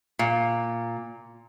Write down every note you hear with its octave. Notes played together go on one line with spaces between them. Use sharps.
A#2